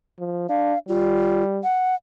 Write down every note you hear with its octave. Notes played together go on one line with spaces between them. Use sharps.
F3
D4 F5
G3 F4
F#5